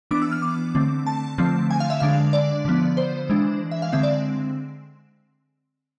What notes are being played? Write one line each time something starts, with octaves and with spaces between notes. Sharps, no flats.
E3 B3 D4 D6
E6
F6
D6
D3 A3 C4
A5
D3 F3 A3 C4
G#5
F5
E5
D3 G#3 D4 F5
D5
D3 F3 B3
C5
E3 G#3 D4
E5
F5
D3 G#3 C4 E5
D5